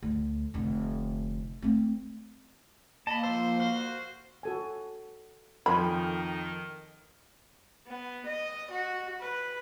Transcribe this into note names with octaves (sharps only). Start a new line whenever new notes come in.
D2
F1 D3
A3 C4
A#3 D#5 A5 B5
F3 C5 E6
F#4 C5 F5
F#4 A4 G#5
F2 D#3 F3 A4 G#5 B5 C6
B3
D#5
F#4
B4